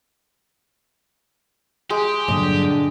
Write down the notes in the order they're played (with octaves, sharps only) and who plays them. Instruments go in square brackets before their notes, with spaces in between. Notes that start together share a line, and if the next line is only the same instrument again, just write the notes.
[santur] G#3 [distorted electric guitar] G4
[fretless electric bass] G2 A#2 F#3 [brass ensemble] D3 D4 [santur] D#5